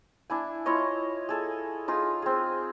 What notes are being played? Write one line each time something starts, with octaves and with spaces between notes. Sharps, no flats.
D4 E4 G#5
E4 F4 C#5 D#5
G#4 A4 G#5
D#4 F4 G#4
C4 G#4